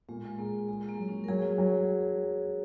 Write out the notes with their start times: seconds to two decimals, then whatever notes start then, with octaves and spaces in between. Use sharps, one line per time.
0.09 A#2 G#3
0.25 G#3
0.39 A#3 G#4
0.68 G#3 G#4
0.82 G#3
0.89 A#3
0.98 F#3
1.08 C#4
1.24 A#4
1.28 F#3 G#4
1.58 F#3